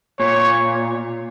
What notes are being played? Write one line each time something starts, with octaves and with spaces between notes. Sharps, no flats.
A#2 C#5